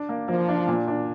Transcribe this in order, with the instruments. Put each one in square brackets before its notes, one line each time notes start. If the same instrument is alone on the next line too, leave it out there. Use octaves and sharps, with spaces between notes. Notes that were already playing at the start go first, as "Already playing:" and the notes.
Already playing: [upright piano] D4
A#3
[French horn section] F3 [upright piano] A#3
[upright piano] D4
A#2
D4